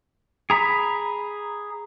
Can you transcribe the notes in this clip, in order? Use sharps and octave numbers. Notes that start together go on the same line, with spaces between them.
G#4 A#5 B5